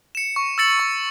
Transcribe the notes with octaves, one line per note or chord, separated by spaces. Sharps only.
C#7 E7
C#6
E6 A6 C#7 F#7
C#6